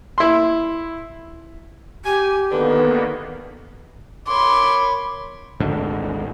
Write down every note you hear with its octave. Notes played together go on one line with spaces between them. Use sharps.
E4 C6
G4 G#5
G#2 B2 D3 D#3 A#3 B3 B4
A#4 C#5 B5 C6 D6
G#1 D2 G#2 D3